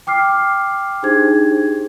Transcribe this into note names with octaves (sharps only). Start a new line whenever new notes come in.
G5 D6 F6 C7
D4 D#4 G4 G#4 C5 G#6